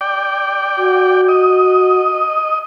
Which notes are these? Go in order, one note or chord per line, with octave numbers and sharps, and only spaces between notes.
D5 G5
F#4
D#5